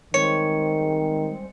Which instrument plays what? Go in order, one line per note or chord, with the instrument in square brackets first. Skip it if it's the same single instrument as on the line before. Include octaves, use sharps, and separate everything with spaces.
[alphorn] D#3 [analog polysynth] G3 G#3 C4 [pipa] C#5 [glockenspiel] C#7